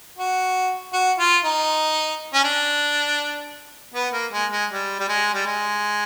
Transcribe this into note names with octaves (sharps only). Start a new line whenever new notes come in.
F#4
F#4
F4
D#4
C#4
D4
B3
A#3
G#3
G#3
G3
G3
G#3
G3
G#3